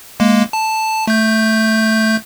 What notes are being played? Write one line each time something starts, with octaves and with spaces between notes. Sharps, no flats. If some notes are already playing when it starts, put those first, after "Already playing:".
G#3 A#3
A5
A3 G6